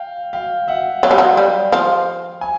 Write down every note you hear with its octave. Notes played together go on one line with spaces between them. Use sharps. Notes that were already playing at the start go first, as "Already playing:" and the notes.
Already playing: F5 G5
F5 G5
E5 F#5
F#3 F5 G5
G3
F#3
G3
F3
G#5